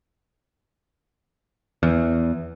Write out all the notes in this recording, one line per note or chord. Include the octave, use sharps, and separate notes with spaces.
E2